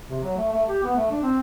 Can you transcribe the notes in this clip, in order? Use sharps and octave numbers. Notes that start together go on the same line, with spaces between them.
C3
F#3
A3
A3
G4
B3
A3
D4
C4